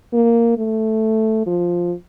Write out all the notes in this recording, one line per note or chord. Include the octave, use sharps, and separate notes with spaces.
A#3
A3
F3